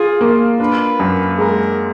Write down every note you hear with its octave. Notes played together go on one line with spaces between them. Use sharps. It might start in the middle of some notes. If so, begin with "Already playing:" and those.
Already playing: F4 G#4
A#3
D4 B4
F#2
G#3 A#4